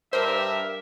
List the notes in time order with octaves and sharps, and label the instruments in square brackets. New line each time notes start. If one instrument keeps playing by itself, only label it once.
[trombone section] G2 [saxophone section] D4 G4 A#4 [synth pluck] C5 [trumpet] E5